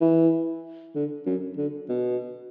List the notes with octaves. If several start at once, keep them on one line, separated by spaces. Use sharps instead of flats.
E3
D3
F#2
D3
B2